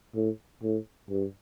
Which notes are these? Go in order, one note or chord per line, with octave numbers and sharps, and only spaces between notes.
A2
A2
G2